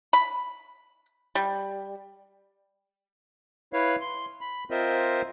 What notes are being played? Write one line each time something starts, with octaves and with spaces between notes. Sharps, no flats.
B5
G3
E4 B4 C#5 F5
C6
B5
C4 F4 A#4 C5 D#5 E5